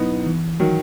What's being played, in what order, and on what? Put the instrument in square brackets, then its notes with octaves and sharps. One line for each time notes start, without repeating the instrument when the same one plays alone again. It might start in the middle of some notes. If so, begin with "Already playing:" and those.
Already playing: [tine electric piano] B2 F#3 C#4 E4 [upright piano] B3 D#4
[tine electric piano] E3
[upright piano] D#3 F#3 [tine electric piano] F#4